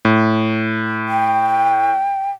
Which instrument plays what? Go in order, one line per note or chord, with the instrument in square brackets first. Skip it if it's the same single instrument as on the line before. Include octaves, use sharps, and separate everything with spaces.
[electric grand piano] A2
[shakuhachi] G5